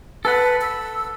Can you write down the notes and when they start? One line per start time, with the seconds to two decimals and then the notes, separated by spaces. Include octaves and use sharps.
0.25 A4 B4 F#5
0.61 E6